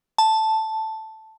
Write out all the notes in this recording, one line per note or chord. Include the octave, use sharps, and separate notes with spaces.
A5